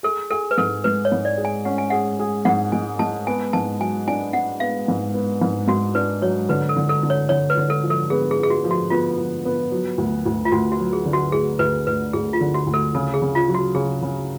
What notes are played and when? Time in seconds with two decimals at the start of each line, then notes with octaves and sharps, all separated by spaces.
0.03 G#4 A4
0.30 G#4 A4
0.51 B4
0.58 G#2 A4
0.84 G#3 B4
1.05 C#5
1.12 G#2
1.25 D5
1.38 G#4
1.45 G#5
1.65 C#4 F#5
1.78 G#5
1.90 G#4 F#5
2.19 G#4
2.45 G#2 F#5
2.72 G#3 G#5
2.99 G#3 A5
3.27 B3 G#5
3.53 G#2 A5
3.80 F#3 G#5
4.07 D4 G#5
4.33 D4 F#5
4.60 B3 F5
4.88 G#2
5.14 B3
5.42 G#2
5.68 G#2 F#4
5.95 D4 B4
6.22 F#3 C#5
6.49 D3 B4
6.69 A4
6.76 D3
6.89 A4
7.03 D3
7.10 C#5
7.29 D3 C#5
7.50 B4
7.57 D3
7.70 A4
7.83 F3
7.90 A4
8.10 B3 G#4
8.31 G#4
8.37 B3
8.43 G#4
8.50 F#4
8.64 F3
8.71 F#4
8.90 B3 F4
9.18 F3
9.45 B3
9.71 F#3
9.98 D2
10.26 D2
10.45 F4
10.52 D2 F#4
10.72 F#4
10.80 F#3
10.93 G#4
11.05 D3
11.13 F#4
11.32 D2 G#4
11.59 D2 B4
11.87 D2 B4
12.13 D2 G#4
12.33 F4
12.41 D3
12.54 F#4
12.67 D2
12.74 A4
12.95 C#3 A4
13.14 G#4
13.22 C#3
13.35 F4
13.48 F#3
13.55 F#4
13.75 C#3 G#4
14.02 C#3